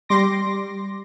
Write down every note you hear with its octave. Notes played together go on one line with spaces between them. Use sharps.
G3 C6 D6 A#6